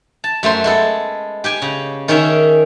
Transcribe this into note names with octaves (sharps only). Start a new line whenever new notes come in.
A5
F#2 A3 C5 C6
G#3 B3 A4
G4 G5 G#5
C#3
D#3 C#4 G#4 A#4 E5